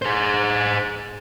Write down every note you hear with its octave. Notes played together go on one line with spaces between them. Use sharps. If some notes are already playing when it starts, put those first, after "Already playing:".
G#4 C5